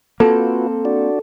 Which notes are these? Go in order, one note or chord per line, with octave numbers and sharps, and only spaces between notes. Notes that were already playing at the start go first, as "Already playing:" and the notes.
A#3 C4 F4 F#4 A4 B4
D4 F#4 D5